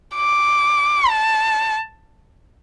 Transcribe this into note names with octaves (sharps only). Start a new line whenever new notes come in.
D6
A5